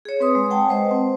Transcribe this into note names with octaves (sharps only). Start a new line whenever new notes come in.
G#4 C#5
C4 B4 C6 D#6
G#3
G#3 F#5 G5 A5
B4 C5 D#5
C4